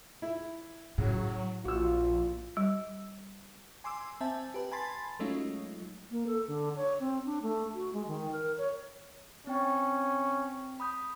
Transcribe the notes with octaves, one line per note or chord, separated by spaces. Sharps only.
E4
A2 C#3 F#3
A#1 F4 F#4 E6
G3
G#5 C6 D6 E6
C4 E5 G#5 A5
G4 B4
G#5 A5 B5 C6 A6
F#3 G#3 A3 C#4 D#4 F4
A#3
A4
D3
C#5
C4
D4
A3
F#4
G#3
D#3
A#4
C#5
C4 C#4 G5
B5 D#6 G6